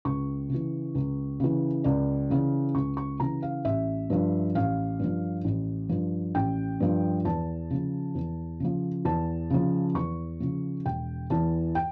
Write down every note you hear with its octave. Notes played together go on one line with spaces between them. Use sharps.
C#2 C#6
C#3 E3
C#2
C#3 E3
C#2 D5
C#3 E3
C#2 C#6
C#6
C#3 E3 A#5
F5
A1 E5
G2 F3
A1 F5
G2 F3
A1
G2 F3
A1 G5
G2 F3
E2 A5
C#3 F3
E2
C#3 F3
E2 A5
C#3 F3
E2 C#6
C#3 F3
E1 G5
E2 E3 A5
G5